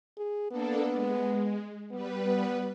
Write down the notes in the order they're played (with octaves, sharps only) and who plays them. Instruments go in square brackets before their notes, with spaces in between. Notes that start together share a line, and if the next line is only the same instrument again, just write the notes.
[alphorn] G#4
[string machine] A#3 D4 A4 [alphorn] B3
[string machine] G#3
[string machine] G3 B4 [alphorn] B3
[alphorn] B3